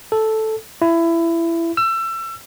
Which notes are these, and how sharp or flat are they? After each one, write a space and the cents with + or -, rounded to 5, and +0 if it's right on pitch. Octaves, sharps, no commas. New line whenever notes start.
A4 -5
E4 +20
E6 +30